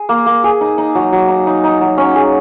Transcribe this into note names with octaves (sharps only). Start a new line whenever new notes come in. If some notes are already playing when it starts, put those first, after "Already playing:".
Already playing: G#4
A#3
A#3
G#4
D#4
D#4
F#3
F#3
D#4
D#4
D#4
F#3
C#4
G#4